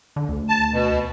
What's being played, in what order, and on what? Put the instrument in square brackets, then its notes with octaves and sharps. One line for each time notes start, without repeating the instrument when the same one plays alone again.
[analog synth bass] D3
D2
[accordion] A5
B2